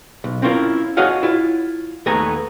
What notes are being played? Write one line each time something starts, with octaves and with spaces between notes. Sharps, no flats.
B1
C4 C#4 E4 F4 A#4
F#4 G#4 C#5 D#5 F5 F#5
E4 F4
D#2 A3 B3 G#5 A#5